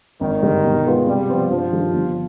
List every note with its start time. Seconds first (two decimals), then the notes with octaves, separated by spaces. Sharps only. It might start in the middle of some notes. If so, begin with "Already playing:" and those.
0.21 G#1 D#3
0.43 G2 D3 G3
0.64 B2
0.85 G#3 B3 F4 B4
1.07 C3 G3
1.29 F3 B3 F4 C5
1.50 G2 F3
1.72 D#3 G3 D4 F4
1.93 G1